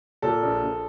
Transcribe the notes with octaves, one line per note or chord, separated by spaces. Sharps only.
A#2 A4
A#1
A#1